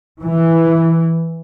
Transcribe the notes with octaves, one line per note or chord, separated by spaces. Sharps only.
E3